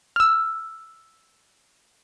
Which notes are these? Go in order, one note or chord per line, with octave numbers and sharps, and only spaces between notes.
E6 F6